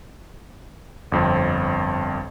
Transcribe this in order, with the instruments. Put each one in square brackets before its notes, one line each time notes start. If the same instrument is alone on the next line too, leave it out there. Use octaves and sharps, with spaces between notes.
[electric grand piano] G1 F2 C4